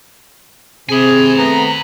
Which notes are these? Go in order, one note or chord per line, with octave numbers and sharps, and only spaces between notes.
C3 C4 G#4 G#5 B5
A3 B3 A#5